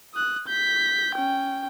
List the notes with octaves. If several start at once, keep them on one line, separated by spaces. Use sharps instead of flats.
D#6 F#6
G6 B6
C#4 G5